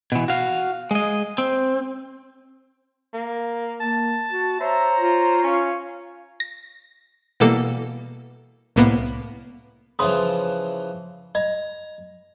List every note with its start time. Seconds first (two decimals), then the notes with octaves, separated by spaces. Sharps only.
0.12 B2 E3
0.28 F#4 F5
0.91 G#3 D#5
1.38 C4
3.14 A#3
3.80 A#3 A5
4.31 F#4
4.60 C5 C#5 E5 A#5
4.96 F4
5.43 C#4 F5 G#5 C#6
6.40 A#6
7.40 B2 E3 G3 A#3 A4
8.76 C2 A2 A#3 B3
9.99 C#3 E3 F3 C#5 C6 D#6
11.35 D#5 A#5